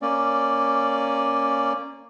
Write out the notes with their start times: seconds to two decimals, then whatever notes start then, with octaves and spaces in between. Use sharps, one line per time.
0.02 A#3 C#4 D5